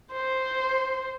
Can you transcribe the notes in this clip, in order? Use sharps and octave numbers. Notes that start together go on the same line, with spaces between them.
C5